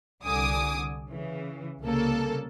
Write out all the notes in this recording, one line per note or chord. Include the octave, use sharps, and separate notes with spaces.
C2 D3 G#5 D6 D#6
C#3 E3
C2 C#3 A#3 A4